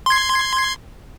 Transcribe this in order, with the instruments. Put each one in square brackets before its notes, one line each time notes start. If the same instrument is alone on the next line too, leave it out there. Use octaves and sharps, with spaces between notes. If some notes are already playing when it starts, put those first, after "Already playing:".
[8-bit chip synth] C6 G#6